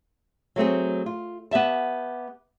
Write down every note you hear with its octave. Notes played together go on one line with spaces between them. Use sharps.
F#3 A3 C4 G#4
F4
B3 G4 E5 A5